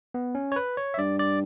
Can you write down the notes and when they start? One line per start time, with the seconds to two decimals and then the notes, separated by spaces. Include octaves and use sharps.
0.14 B3
0.35 C#4
0.52 C#5
0.56 B4
0.77 C#5
0.94 E5
0.98 G2 D5
1.19 D5